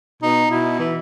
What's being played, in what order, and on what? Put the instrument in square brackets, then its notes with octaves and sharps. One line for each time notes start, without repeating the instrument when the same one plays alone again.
[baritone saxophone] B2 [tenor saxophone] D#4
[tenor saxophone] B2 [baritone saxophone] E4
[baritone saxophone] E3